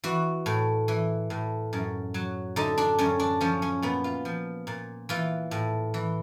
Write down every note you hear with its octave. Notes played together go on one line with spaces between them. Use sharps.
E3 F#4
A2
E3
A2
F#2
F#3
D3 D#4
D4
F#2 C#4
D4
F3 C#4
C#4
A#2 B3
F4
F3
A#2
E3 F4
A2
E3